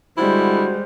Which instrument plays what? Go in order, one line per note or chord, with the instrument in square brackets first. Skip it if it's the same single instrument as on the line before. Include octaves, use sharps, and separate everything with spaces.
[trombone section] D3 F#4 [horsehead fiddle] G3 G#3 [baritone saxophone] E4 [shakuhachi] C5